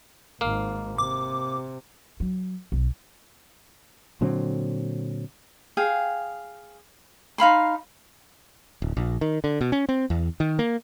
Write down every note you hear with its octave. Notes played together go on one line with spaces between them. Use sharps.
G#1 G#2 A#3 F5
C3 D6
F#3
B1
A#2 D3 F#3 C4
G#4 F5 G5
D#4 F5 B5 C6
D1
A#1
D#3
D3
B2
C#4
C4
E2
D#3
A#3